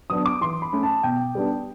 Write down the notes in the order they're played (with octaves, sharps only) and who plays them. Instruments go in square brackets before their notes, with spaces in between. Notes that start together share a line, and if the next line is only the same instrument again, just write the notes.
[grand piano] F#3 B3 D4 D#6
D6
E3 C6
B5
A3 C#4
A5
B2 G5
G3 B3 D4